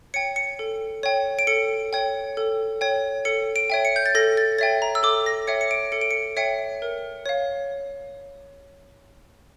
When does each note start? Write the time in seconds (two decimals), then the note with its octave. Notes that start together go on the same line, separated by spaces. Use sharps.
0.14 C#5 G5 C#7
0.36 C#7
0.59 A4
1.03 C#5 G5
1.39 D7
1.47 A4 C#7
1.93 C#5 G5
2.37 A4
2.81 C#5 G5
3.25 A4 C#7
3.56 D7
3.70 C#5 E5 G5
3.85 C#7
3.96 G6
4.06 A6
4.15 A4 A#6
4.37 A6
4.58 C#5 E5 G5 A6
4.82 A#5
4.95 E6
5.03 A4 D6
5.26 A#6
5.47 C#5 E5 G5 C#7
5.61 C#7
5.71 D7
5.92 A4 C#7
6.01 D7
6.11 C#7
6.37 C#5 E5 G5 C#7
6.82 A#4
7.26 C#5 F5